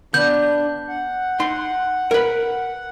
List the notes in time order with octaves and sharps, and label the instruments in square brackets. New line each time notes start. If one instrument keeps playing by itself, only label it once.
[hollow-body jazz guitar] B3 [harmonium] D4 [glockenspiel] G6
[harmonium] F#5
[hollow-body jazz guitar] D#4 C6
A#4 B4